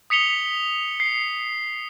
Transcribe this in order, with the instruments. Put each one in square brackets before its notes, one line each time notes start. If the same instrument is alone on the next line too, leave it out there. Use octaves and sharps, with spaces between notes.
[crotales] D#6 B6 C#7 F7 G7
C7